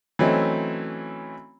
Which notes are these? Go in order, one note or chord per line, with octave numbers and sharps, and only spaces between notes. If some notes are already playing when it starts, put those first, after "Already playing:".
E3 F#3 A3 C4 C#4 D#4